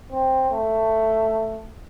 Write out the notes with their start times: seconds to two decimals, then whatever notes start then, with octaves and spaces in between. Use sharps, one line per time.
0.12 C4
0.51 A3